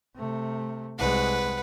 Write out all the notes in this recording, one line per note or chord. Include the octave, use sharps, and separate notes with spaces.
C3 A3
C2 G#3 B4 F#5